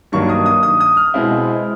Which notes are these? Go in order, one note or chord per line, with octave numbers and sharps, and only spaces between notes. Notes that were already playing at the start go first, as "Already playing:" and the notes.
G2 D#3 F#3 A#3 D4 C#6
D#6
D#6
D#6
D#6
F6
B2 G#3 C4 E4